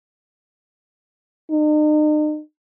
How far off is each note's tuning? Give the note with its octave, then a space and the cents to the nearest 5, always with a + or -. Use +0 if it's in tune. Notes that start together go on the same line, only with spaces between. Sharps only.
D#4 -45